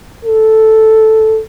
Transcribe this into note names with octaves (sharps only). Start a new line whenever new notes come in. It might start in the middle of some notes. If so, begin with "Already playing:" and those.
A4